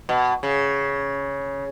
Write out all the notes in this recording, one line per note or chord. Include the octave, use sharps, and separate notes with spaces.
B2
C#3